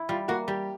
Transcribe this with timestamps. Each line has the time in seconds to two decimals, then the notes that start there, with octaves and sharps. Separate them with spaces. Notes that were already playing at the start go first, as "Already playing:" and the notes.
Already playing: E4
0.09 G3 F4
0.28 A#3 F#4
0.47 G3 G4